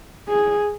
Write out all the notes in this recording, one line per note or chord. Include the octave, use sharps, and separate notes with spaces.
G#4